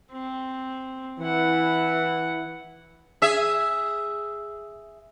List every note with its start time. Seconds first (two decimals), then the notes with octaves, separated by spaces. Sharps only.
0.11 C4
1.19 E3 E4 F#5
3.22 G#4 E5